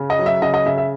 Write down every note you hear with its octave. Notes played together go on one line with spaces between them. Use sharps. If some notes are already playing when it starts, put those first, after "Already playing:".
Already playing: C#3
D#5
F#3
E5
C#3 D#5
D#5
C#3 E5
E5